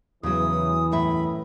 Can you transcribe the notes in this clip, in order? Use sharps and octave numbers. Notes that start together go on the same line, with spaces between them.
E2 C#3 E3 F#3 D#6
F#2 A2 E5 B5